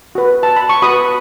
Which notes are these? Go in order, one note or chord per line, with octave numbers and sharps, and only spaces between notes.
F#4 B4
A5
B5
C#6
F#4 B4 B5 D#6